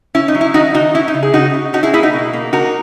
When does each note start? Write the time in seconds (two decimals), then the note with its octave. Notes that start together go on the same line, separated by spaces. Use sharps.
0.15 C#4 E4
0.28 D#4
0.35 F#3
0.41 E4
0.54 D#3 D#4 F#4
0.74 D#3 D#4 F#4
0.94 C#4 E4
1.08 D#4
1.14 C#3
1.23 G#4
1.34 C#3 D#4 F#4
1.54 C#3
1.73 C#4 D#4 F#4
1.83 E4 G#4
1.93 A#3 E4 G#4
2.03 D#4 F#4
2.13 B2
2.33 A#3
2.53 D#4 F#4 A#4